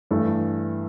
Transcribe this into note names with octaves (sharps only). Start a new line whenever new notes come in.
G2 E3 A3